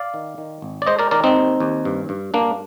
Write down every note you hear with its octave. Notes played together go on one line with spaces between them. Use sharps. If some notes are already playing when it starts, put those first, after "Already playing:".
Already playing: D5 F5
D#3
D#3
G#1
D5
G#3 C5 D#5
A#4 D5
D#3 A#4 D5
C4 D#4
D#2
D#2
G2
G2
G2 A#3 D4